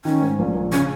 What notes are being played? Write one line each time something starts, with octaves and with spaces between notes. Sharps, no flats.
D#3 C#4
G#2
A#1
A#1
C#3 C#4